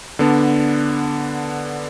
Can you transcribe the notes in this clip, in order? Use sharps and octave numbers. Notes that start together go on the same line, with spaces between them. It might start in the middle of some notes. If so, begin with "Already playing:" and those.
D3 B3 D4